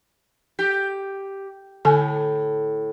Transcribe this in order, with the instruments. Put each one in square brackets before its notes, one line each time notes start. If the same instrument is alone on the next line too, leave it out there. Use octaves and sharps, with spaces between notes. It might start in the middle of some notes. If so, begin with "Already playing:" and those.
[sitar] G4
[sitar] A2 [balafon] D3 A4 G#5